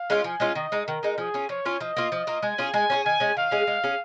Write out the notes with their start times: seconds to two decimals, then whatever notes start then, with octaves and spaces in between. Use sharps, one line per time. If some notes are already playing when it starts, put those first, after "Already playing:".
Already playing: F5
0.10 G#3 C#4 F4
0.24 F3 G#5
0.40 G#3 C#4 F4
0.55 D#3 D#5
0.72 G#3 D#4
0.87 D#3 A#4
1.03 G#3 D#4
1.18 F3 G#4
1.34 C#4 F4
1.49 F3 C#5
1.65 C#4 F4
1.80 F3 D#5
1.97 A#3 F4
2.12 F3
2.27 A#3 F4
2.43 G#3 G#5
2.58 C#4 F4 G#4
2.74 G#3 G#5
2.90 C#4 F4 G#4
3.05 D#3 G#5
3.20 G#3 C#4 G#4
3.36 D#3 F5
3.51 G#3 C#4 G#4
3.67 G#3
3.84 C#4 G#4